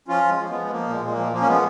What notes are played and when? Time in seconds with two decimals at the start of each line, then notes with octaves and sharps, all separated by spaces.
0.08 F3 C#4 F4
0.24 F3
0.29 G#3
0.39 F3
0.50 G#3 B3
0.55 F3
0.70 F3 A#3
0.86 A#2 G#3
1.01 A#2
1.12 F3 A#3
1.32 F3 A#3
1.40 C#4
1.47 F3 G#3 B3